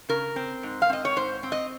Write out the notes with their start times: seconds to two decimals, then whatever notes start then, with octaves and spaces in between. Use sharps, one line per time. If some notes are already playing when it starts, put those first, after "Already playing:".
0.09 C#3 A#4
0.36 C4
0.63 G#2
0.82 F5
0.89 C4 D#5
1.05 C#5
1.16 G#2 C5
1.43 C4
1.52 D#5